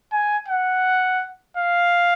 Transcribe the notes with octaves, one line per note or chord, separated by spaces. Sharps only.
G#5
F#5
F5